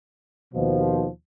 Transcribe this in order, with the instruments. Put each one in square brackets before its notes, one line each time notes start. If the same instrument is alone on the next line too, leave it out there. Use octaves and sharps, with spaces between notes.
[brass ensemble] D#2 B2 F3